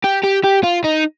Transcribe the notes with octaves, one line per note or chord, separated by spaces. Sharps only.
G4
G4
G4
F4
D#4